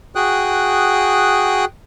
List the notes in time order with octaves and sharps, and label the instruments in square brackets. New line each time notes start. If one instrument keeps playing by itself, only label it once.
[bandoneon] F#4 G#4 G5 D#6 F#6